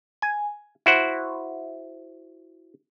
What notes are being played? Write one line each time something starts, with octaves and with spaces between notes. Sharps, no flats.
G#5
E4 F#4 C5 F#5